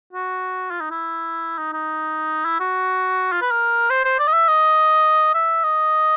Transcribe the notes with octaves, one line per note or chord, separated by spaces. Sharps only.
F#4
F4
D#4
E4
D#4
D#4
E4
F#4
F4
B4
A#4
C5
C5
D5
D#5
E5
D#5
E5
D#5